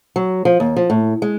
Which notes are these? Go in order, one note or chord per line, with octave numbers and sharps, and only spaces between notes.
F#3
F3
D#2
F3
A2
G#3